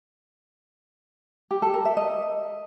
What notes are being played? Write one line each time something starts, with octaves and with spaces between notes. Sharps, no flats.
G4
A4
A#4
E5
D#5